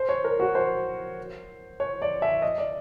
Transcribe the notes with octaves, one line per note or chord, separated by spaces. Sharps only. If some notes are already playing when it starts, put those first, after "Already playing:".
Already playing: C5
C#5
A#4
F#4
C5
C#5
D5
E5
D#5
D5